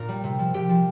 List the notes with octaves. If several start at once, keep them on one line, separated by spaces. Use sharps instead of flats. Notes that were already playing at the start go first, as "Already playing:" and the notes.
Already playing: A#2 A#4
G3
C3
F3
C3 G4
F3